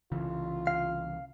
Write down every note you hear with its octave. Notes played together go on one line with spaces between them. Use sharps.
C2 C#3 E3 F4
F5